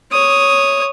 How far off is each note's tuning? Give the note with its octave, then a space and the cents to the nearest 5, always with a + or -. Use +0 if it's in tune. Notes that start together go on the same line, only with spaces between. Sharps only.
C#5 +0 D#6 +0